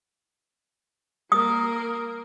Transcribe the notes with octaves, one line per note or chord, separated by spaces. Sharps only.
A#3 A#4 D#6